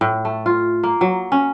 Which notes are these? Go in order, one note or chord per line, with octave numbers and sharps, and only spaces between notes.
A2
A3
F4
A#3
F#3
C#4